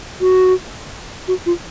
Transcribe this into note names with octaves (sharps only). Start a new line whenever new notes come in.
F#4
F#4
F4